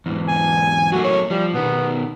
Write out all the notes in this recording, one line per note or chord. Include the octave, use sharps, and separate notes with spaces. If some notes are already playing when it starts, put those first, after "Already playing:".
E2 G#2
G#5
F#3 A3 A#3 F#4
C#5
F3 G3
B2 D#3 B3